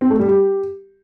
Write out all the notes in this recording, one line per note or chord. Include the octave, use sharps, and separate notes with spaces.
C4
A3
G3
G4